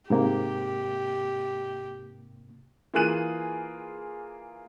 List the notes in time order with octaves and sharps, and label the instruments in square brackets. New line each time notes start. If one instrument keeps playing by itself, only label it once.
[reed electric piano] G#2 C3 A#3 [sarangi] G4
[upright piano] E3 A#3 F4 G#4 F#6 D#7